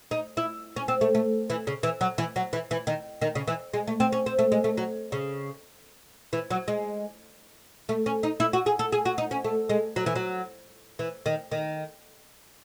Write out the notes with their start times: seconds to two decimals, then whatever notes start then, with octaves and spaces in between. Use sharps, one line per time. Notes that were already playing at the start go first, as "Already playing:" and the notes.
0.11 D#4
0.37 E4
0.76 C#4
0.88 C4
1.01 A3
1.15 A3
1.50 E3
1.67 C#3
1.83 E3
2.01 F#3
2.18 E3
2.36 F#3
2.53 E3
2.71 E3
2.87 D#3
3.21 D#3
3.35 C#3
3.48 E3
3.74 G#3
3.87 A3
4.00 C4
4.13 C#4
4.26 C4
4.39 A3
4.52 G#3
4.64 A3
4.77 F#3
5.12 C#3
6.33 E3
6.51 F#3
6.68 G#3
7.89 A3
8.06 C#4
8.23 D#4
8.40 E4
8.53 F#4
8.66 G#4
8.79 A4
8.92 G#4
9.05 F#4
9.18 D#4
9.31 C#4
9.44 A3
9.69 G#3
9.96 F#3
10.06 E3
10.16 F#3
10.99 E3
11.26 D#3
11.52 D#3